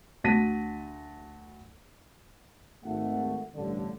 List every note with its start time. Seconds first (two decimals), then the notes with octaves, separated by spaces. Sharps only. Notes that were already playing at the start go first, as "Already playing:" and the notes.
0.24 D2 F#4 A5 A#6 B6 D#7
2.84 G#1 A3 F#5
3.55 A1 G2 D3